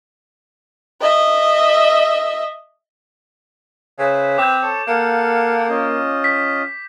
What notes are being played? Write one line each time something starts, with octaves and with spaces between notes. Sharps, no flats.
D#5 E5
C#3 B4 C5 E5
C4 D6 G6
A4 C#5 A5
A#3 A4 F5 F#5
C#4 F4 D#5
B6